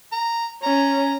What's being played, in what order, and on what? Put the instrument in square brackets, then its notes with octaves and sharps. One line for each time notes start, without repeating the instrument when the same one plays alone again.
[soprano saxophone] A#5
[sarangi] C#4 [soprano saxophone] A#5